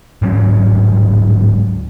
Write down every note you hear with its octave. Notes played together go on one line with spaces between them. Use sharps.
D1 G#2 F#3 C#4